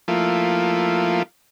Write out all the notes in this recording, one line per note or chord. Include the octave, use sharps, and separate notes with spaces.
F3 A3 A#3 E4 F4